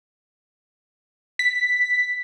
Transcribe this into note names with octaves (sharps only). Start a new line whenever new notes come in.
B6